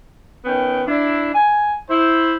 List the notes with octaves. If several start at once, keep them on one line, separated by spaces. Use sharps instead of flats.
D#3 B3 C#4 G5
D4 E4
G#5
E4 C5